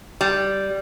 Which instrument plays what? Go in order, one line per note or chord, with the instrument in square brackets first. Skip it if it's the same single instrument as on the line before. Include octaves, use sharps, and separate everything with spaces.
[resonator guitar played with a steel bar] G3